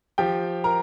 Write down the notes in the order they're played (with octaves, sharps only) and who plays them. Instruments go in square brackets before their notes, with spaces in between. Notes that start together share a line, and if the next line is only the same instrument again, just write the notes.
[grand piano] F3 G4 G5
A#4 A#5